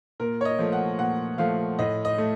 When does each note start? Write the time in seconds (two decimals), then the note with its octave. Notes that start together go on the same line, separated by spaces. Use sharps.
0.20 A#2 A#4
0.41 C#5
0.45 D#5
0.59 F3 A3
0.72 F#5
0.99 A#2 F#5
1.38 F3 A3 F5
1.79 A2 D#5
2.05 D#5
2.18 A3